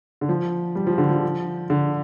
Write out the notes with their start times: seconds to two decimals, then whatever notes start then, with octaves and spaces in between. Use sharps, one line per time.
0.21 D3
0.29 F3
0.75 G3
0.87 F3
0.98 D3
1.09 F3
1.70 D3